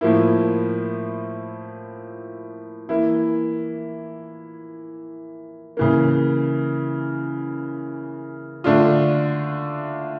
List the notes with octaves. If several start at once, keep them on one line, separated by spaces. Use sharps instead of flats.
A2 F3 A#3 E4
E3 A#3 E4
C#3 E3 A#3
D3 A3 D4 F4